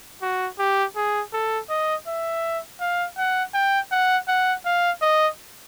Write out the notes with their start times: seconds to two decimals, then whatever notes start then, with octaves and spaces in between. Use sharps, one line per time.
0.22 F#4
0.59 G4
0.96 G#4
1.33 A4
1.70 D#5
2.07 E5
2.80 F5
3.18 F#5
3.54 G5
3.92 F#5
4.28 F#5
4.65 F5
5.02 D#5